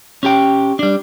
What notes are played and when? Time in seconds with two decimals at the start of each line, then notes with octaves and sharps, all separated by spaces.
0.23 C#4 G4 G5
0.79 G3 D4